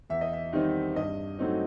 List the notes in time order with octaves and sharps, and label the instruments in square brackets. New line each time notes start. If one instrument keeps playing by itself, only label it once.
[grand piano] E2 E5
D#5
E5
D#3 G3 C4 D#4
G2 D#5
F#3 A3 C4 D#4